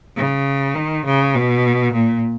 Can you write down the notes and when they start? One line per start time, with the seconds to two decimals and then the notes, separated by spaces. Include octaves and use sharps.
0.16 C#3
0.75 D#3
1.05 C#3
1.35 B2
1.93 A#2